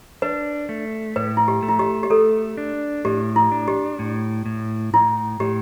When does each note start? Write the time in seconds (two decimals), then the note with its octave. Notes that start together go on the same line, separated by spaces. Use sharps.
0.22 D4 B4
0.69 A3
1.16 A2 B4
1.37 E4
1.48 G4
1.63 A3
1.68 E4
1.79 G4
2.03 G4
2.10 A3 A4
2.58 D4
3.05 A2 G4
3.36 E4
3.52 D4
3.68 G4
3.99 A2
4.46 A2
4.93 A2 E4
5.40 A2 G4